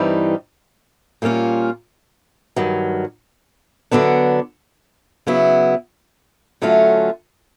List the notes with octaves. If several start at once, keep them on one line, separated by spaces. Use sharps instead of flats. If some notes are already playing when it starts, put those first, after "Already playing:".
Already playing: G2 E3 G3 C4 D#4
A#2 G3 A#3 C#4 F4
G2 D#3 F#3
D3 F#3 B3 D4
C#3 F#3 B3 E4
D3 F#3 A3 C#4 F4